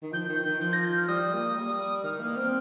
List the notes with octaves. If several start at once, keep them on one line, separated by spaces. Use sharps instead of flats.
D#3
F3 G6
D#3
D#3
F3 G6
A#6
G6
F6
G3 D#6
A#3
G3
D#3 F6
A#3
C4